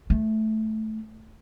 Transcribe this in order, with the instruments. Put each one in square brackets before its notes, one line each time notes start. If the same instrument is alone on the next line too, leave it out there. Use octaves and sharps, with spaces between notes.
[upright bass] A3